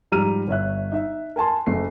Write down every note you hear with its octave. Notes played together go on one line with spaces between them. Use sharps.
G#2 F3 G3 A#5 F6 D#7
G1 C#5 E5 F#6
D#4 E5
A#4 G#5 A5 C6
F#1 A3 C7